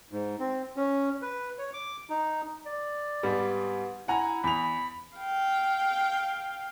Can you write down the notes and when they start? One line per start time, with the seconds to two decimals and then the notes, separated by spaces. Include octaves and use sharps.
0.12 G#2
0.39 C4
0.76 C#4
1.22 B4
1.58 C#5
1.73 D6
2.10 D#4
2.66 D5
3.23 G#2 G3 B3
4.08 E4 F#5 G#5 A#5
4.44 E2 B5 F7
5.17 F5 G5